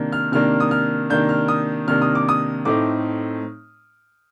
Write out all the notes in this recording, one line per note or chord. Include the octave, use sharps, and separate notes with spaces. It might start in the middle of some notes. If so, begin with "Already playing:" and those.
Already playing: C3 D#3 A#3 D4
F6
C3 D#3 A#3 D4 F6
D#6
F6
C3 D#3 A#3 D4 G6
F6
D#6
C3 D#3 A#3 D4 F6
D#6
D6
D#6
A2 A3 C4 D#4 D6